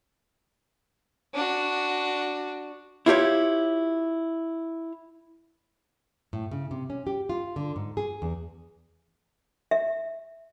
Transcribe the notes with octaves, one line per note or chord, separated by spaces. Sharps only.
D4 F#4
E4 F4 G4 C#5
A2
C#3
C3
C#4
G4
F4
D3
G#2
G#4
E2
E5